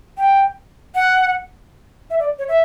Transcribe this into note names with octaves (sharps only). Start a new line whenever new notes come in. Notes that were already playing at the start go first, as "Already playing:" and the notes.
G5
F#5
E5
D5
C#5
E5